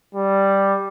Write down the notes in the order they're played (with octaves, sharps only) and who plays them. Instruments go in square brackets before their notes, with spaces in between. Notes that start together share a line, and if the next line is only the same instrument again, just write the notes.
[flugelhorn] G3